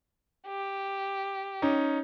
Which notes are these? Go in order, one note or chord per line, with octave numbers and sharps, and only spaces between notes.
G4
C#4 D#4